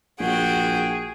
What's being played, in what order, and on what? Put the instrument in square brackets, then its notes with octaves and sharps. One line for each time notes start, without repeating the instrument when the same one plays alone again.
[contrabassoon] A#1 [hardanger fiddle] F#4 G5 [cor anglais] G#4